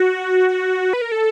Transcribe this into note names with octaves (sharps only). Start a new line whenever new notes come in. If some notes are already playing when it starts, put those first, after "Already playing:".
Already playing: F#4
B4
A#4
A4